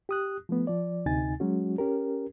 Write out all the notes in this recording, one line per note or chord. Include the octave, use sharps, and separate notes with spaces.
G4 D#6 F#6
F3 A3 B3
F3 D5
D2 C3 D#4 G#5 A6
F#3 G#3 C#4 F#4
C#4 G4 A#4